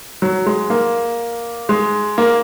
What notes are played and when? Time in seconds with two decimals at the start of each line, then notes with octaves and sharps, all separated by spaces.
0.22 F#3
0.46 G#3
0.70 A#3
1.69 G#3
2.18 A#3